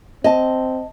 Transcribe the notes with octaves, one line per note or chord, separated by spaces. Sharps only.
C4 D#5 A5